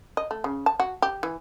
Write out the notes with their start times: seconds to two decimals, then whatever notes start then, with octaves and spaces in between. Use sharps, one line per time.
0.17 D#5
0.31 A3
0.44 C#3
0.66 A5
0.80 F#4
1.02 G4
1.23 E3